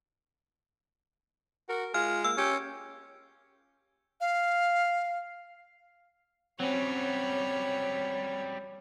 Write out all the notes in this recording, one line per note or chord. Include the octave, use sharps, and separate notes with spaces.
F#4 A#4
G#3 F4 F6
A#3 E6
C#4 G4
F5
F#3 G3 C4 C#4 C#5